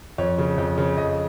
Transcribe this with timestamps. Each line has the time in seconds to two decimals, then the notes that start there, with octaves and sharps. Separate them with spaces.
0.18 F2 C#5
0.38 C#3
0.58 F2
0.78 C#3
0.98 F2 D#5